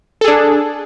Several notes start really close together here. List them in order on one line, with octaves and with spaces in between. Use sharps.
A4 G#4 D4